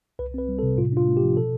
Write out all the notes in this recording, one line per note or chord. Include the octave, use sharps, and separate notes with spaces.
C2 B4
C4 B4
G3
A4
C3
A2 F4
D4 F4
A3
G4
F3
B2 A4